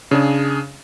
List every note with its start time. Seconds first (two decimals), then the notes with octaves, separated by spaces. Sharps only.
0.11 C#3 D4 G#4